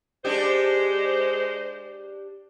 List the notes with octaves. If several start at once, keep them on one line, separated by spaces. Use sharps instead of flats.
G#3 D4 G4 C5